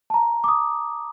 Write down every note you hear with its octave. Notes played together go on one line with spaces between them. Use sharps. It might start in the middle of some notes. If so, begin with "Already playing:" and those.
A5
A#5
D6
D#6